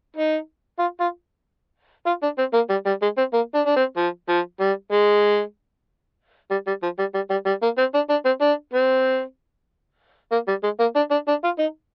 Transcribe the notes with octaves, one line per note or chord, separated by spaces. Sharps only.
D#4
F4
F4
F4
D4
C4
A#3
G3
G3
G#3
C4
A#3
D4
D4
C4
F3
F3
G3
G#3
G3
G3
F3
G3
G3
G3
G3
A#3
C4
D4
D4
C4
D4
C4
A#3
G3
G#3
A#3
D4
D4
D4
F4
D#4